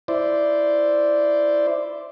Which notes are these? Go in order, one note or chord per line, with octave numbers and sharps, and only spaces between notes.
E4 C5 D5